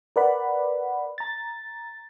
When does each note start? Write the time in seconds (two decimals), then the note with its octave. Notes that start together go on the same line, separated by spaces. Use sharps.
0.16 A#4 B4 D5 F#5 B5
1.18 A#5 A6